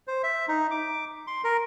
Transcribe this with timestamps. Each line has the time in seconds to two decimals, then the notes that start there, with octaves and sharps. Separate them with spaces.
0.07 C5
0.23 E5
0.48 D#4
0.71 D6
1.27 C6
1.44 A#4